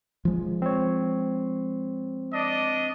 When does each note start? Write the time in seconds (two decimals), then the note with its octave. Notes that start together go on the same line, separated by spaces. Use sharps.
0.25 F3 G#3
0.62 C4 C#5
2.33 D4 D5 D#5